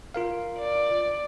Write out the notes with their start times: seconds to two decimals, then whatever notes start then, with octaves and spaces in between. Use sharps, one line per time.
0.14 F4 A#4 F5
0.59 D5